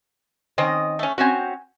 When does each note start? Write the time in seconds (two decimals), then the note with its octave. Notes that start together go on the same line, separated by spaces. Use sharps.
0.58 D#3 C4 C#4 D#5
0.99 A3 C#4
1.18 C4 C#4 F#4 F#5 G#5